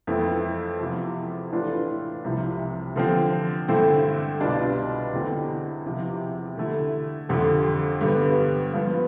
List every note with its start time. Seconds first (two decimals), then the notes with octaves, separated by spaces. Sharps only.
0.07 F2 E3 A3 C4 E4
0.79 E2 C3 F3
1.52 A2 E3 A3 D4 F4
2.24 C2 C3 F3
2.96 D3 F3 C4
3.68 G2 D3 A3 C4 E4
4.40 C2 B2 G3 D4 F4
5.13 E2 D3 G3 C4
5.85 E2 C3 F3
6.57 D3 A3 E4
7.29 F2 D3 G3
8.01 G2 D3 G3 B3
8.73 G2 F3 B3